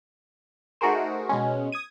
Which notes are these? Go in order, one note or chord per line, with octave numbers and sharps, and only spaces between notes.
A3 D#4 F#4 G#4 A#4 C5
B2 G#3 C#4
D#6 G#6 D#7